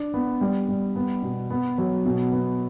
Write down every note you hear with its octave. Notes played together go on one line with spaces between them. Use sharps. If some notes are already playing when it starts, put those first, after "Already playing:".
Already playing: D4
B3
G3
G3
B3
B2
B3
F#3
B2
B3